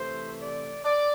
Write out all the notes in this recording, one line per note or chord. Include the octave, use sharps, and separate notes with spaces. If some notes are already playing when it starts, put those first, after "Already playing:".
Already playing: C3 E3 A3 C5
D5
D5